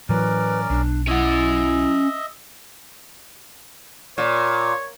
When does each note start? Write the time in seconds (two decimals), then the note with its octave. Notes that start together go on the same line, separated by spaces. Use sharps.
0.09 A2 E3 F#3 C#4 A#4 B4 D5
0.70 B1 D4
1.08 C#4 E4 D#5 E5 F#5
4.18 A#2 C#5